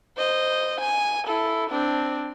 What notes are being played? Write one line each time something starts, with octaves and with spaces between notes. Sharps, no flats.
C5 D#5
G#5
E4 A4
C4 D4